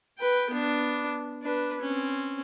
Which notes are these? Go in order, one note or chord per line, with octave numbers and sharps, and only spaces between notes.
B4 G5
B3 D4
D4 B4
C4 C#4